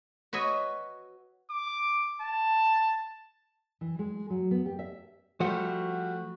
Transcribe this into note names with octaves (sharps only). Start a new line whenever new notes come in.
F#4 B4 C#5 D#5 E5
D6
A5
E3
G#3
F#3
B3
G4
E5
F3 G3 A3 F#4 C5 F#5